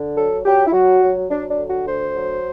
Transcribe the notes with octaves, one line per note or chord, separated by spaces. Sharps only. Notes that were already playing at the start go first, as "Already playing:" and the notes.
Already playing: D3
F#3 A4
F#3 G4
E4
F#3 F#4
F#3
F#3 D4
D4
D3
F#4
D2 C5
F#3